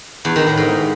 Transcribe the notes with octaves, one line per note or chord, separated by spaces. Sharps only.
E2
D#3
A2
G#2